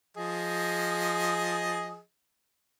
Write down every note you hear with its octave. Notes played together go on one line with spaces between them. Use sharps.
F3 G#4 D#5